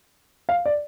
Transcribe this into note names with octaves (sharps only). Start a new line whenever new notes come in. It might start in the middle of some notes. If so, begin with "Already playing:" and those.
F5
D5